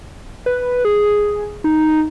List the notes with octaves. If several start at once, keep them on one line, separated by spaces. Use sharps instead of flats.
B4
G#4
D#4